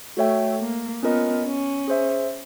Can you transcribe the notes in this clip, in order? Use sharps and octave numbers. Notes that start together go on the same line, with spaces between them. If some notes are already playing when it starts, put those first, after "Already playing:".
A3 F#4 A4 C#5 E5 G5
A#3
B3 C#4 F4 A#4 D#5
C#4
G#4 C5 E5